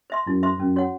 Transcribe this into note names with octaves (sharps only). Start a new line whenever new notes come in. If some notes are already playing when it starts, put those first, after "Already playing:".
C5 E5 C6
F#2 E4
C5 E5 C6
F#2 C#4
F#4 C#5 F#5